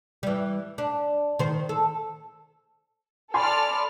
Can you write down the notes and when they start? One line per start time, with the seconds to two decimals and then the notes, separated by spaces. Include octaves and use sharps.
0.23 E3 G3
0.78 D4
1.39 D#3 C5
1.69 A4
3.34 A4 D5 G#5 B5 C6 F6